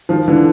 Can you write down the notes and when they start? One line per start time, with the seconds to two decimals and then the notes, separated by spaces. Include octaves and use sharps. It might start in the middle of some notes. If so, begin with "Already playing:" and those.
0.09 D#3 F3
0.28 D3 E3